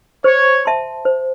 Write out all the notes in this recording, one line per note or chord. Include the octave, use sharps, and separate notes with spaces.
C5 C#5
E5 A5 C6
C5